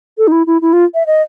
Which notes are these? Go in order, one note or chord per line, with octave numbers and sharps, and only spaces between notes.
A4
D#4
E4
E4
E4
F4
E5
D#5